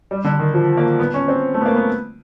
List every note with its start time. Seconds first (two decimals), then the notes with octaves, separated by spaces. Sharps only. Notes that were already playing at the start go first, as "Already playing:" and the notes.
0.11 G3
0.24 D3
0.39 D#3
0.54 F3
0.77 A#3
1.00 B3
1.14 C#4
1.28 C4
1.54 A3
1.61 B3
1.66 A#3
1.76 B3